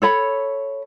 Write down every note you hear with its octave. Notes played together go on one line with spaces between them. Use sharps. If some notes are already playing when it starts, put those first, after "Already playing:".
A4 C#5 B5